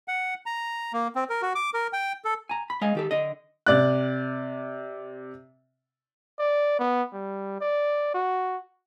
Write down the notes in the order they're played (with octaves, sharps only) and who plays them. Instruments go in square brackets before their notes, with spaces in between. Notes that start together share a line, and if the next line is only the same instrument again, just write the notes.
[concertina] F#5
A#5
A#3
C4
A#4
F#4
D6
A#4
G5
A4
[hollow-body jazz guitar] G#5 A#5
B5
G#3 D#5 F5 G#5
D#3 G4 A4
D3 D#5
[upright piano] C3 D5 F#6
[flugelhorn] D5
B3
G3
D5
F#4